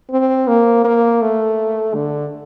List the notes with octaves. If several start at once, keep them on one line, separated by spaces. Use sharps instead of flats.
C4
A#3
A#3
A3
D3